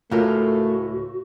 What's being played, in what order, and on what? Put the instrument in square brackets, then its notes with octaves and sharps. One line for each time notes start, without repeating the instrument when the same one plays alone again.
[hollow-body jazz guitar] C#2 A2 [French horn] A3 [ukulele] F4 A#4 F5 [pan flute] F#4